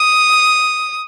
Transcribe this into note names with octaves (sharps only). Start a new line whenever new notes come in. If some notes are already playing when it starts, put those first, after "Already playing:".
Already playing: D#6